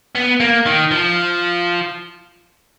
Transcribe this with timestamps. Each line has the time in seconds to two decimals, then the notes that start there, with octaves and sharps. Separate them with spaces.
0.16 B3
0.40 A#3
0.66 D#3
0.91 F3